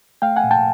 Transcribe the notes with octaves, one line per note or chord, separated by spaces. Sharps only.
A3 F5 G5
F#5 G#5
A#2
G5 A5